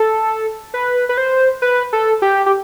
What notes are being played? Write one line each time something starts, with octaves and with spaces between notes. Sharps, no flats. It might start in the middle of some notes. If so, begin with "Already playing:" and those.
Already playing: A4
B4
B4
C5
B4
A4
G4
G4